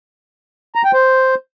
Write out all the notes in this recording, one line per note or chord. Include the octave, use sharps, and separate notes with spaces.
A#5
G5
C5